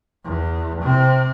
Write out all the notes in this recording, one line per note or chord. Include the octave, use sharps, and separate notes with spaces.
E2
C3 C4